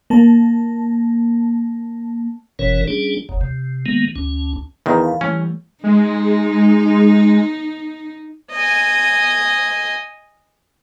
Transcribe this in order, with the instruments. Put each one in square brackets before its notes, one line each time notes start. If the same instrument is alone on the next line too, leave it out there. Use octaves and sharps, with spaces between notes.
[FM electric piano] A#3 A5
[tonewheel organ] F#1 B2 E3 C#4 A#4 C#5
G3 C#4 D4 G#4
F#1 D#2
C3
D#3 G#3 A#3 B3
D2 C#4
[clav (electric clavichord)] E2 D#3 [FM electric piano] F5 A#5 D#6
[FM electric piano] F5 A5 B5
[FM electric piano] E3 G3 A3 [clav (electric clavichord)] C#4
[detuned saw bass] G#3 [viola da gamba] D#4
[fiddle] D#5 G#5